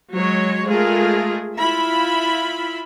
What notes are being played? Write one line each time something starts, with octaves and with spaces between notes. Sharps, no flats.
F#3 G#3 C#5
G#3 A3 F4 G#4 A#4
E4 F4 E5 B5